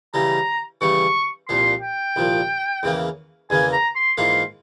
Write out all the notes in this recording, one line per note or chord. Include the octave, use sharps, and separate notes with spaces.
C#3 E3 G3 A#5
C#3 E3 G3 C#6
C2 A#2 F3 C6
G5
C2 A#2 F3
E2 C#3 E3 A#3
E2 C#3 E3 A#3 G#5
A#5
C6
G#2 E3 A#3 F4 C6